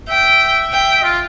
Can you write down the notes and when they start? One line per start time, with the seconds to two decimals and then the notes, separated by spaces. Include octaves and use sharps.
0.09 E5 G5
0.73 G5
1.03 F4